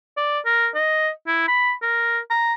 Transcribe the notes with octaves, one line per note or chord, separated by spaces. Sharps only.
D5
A#4
D#5
E4
B5
A#4
A#5